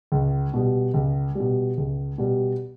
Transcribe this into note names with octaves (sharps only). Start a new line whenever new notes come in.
C#2
B2 G3
C#2
B2 G3
C#2
B2 G3